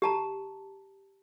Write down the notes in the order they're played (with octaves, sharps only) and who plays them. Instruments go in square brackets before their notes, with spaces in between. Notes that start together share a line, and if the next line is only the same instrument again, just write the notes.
[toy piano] G4 A5 A#5